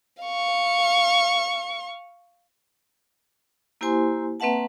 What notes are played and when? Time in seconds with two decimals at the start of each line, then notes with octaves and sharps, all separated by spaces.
0.23 F5 C#6
3.81 A#3 E4 G4 C5 G#5 C6
4.40 A#3 C4 B4 E5 F#5 A5